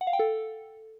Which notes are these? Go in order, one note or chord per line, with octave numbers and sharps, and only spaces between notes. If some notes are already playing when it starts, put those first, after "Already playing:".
F#5
F5
G5
A4